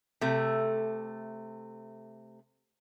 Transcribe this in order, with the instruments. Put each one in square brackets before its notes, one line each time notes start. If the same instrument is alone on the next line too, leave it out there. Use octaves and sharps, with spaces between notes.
[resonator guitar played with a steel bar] C3 A3